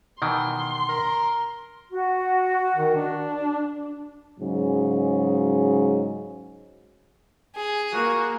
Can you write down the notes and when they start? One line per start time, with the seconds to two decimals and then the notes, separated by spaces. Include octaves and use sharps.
0.22 B2 D#3 E3 C6
0.89 A#4
1.90 F#4
2.76 D#3
2.96 D4
4.38 G#2 C#3 F#3
7.56 G#4
7.93 A#3 F#4